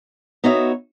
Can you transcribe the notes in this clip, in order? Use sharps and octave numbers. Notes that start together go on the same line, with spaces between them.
B3 D#4 F#4 C#5 E5